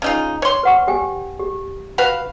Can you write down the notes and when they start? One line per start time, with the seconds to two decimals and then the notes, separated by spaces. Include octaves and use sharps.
0.02 C#3 D#4 F4
0.42 C#5 C6
0.63 B4 F#5 C#6
0.88 G4 G5 G#5
1.39 G4
1.98 F#4 B4 F5